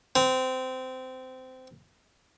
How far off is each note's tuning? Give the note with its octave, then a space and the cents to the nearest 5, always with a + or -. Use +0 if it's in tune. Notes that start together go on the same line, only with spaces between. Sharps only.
C4 -20